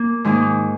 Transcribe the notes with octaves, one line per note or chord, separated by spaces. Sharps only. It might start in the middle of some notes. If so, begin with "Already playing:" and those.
Already playing: A#3
G#2 D#3 A#3